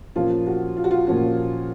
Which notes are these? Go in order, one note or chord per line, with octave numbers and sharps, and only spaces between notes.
A#2 F3 A#3 C#4 F4
F#4
F4
F#4
F4
A#2 F3 A#3 C#4 F#4